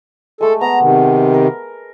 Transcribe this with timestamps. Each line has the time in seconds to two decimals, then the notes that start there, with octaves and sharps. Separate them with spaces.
0.41 G#3 A3 A4
0.61 B3 A#5
0.81 C3 D#3
1.34 A#4